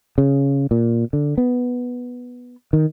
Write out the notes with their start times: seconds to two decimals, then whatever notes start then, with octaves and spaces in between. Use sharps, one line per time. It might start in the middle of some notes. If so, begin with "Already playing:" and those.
0.18 C#3
0.71 A#2
1.13 D3
1.38 B3
2.73 D#3